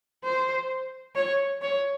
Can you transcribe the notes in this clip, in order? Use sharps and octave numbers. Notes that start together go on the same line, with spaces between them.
C5
C#5
C#5